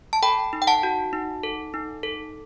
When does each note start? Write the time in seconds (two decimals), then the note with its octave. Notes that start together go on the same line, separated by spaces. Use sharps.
0.13 A5
0.23 A4 G5 B5
0.53 D#4
0.62 G5
0.67 F#5 A5
0.83 F#4
1.13 D#4
1.43 A4
1.74 D#4
2.03 A4